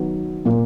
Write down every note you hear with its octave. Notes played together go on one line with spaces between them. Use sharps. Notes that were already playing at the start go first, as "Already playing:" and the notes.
Already playing: D#3 F#3 B3
A#2 A#3